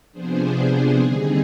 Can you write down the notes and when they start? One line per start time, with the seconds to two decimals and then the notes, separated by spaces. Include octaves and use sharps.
0.12 C3 F3 B3 D4 G#4 C5
0.98 D#2 D3 G3 C4 D#4 G#4